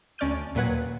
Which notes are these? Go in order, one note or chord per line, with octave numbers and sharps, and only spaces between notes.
D2 C#4 D5 F6 G6 D#7
D#2 A#2 F#3 B4 F#5 G#6